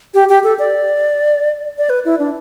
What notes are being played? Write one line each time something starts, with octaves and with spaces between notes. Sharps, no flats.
G4
G4
A4
D5
D5
B4
E4
D4